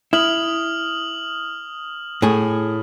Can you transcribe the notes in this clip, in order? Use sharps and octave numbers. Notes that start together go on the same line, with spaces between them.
E4 D#6 F6 F#7
A2 G#4